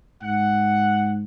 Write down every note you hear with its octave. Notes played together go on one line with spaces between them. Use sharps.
G#2 F#5